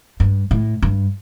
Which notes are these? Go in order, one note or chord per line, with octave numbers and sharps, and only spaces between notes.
G2
A2
G2